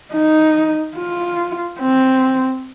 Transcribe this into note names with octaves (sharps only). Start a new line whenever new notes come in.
D#4
F4
C4